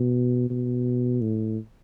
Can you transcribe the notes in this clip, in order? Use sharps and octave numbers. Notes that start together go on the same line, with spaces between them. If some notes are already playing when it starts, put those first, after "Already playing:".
Already playing: B2
B2
A2